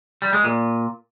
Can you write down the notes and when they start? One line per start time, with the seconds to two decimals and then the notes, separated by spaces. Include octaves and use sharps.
0.22 G3
0.33 G#3
0.44 A#2